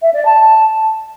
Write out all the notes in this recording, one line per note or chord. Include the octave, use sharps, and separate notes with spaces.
E5
D5
A5